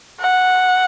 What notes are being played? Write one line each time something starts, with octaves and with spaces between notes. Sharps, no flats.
F#5